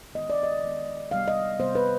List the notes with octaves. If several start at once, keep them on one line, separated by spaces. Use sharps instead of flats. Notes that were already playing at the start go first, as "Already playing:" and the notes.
D#3 G#3 B3 D#5
D5
D#5
D#3 G#3 B3
C3 G3 B3 F5
D#5
C3 G3 B3 C5
B4